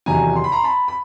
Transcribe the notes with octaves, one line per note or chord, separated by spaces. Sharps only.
E2 C3 D#3 F#3 G#5 A#5
C6
B5
A#5 C6
A5 B5
B5